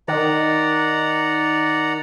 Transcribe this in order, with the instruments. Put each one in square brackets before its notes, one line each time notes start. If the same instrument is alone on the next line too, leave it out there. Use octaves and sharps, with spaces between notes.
[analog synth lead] D#3 [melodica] D5 F#5 A#5